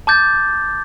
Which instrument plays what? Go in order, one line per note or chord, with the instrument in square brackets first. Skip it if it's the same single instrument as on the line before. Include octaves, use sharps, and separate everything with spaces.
[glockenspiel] A5 D6 G6 A6